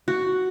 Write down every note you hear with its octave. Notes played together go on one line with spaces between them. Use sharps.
F#4